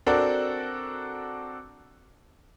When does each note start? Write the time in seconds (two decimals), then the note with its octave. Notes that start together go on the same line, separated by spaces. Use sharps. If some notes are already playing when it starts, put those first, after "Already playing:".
0.06 C4 D4 F#4 A4 A#4 D5